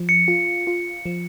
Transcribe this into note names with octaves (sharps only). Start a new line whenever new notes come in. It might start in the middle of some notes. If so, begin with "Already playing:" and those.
Already playing: F3
C#7
F4
F4
F3